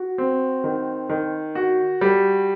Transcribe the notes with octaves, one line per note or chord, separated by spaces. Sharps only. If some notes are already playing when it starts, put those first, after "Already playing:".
Already playing: F#4
C4
D#3
D#3
F#4
G3